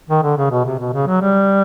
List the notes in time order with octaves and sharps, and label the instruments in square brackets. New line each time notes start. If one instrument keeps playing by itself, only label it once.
[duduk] D#3
D3
C#3
B2
C3
B2
C#3
F#3
G3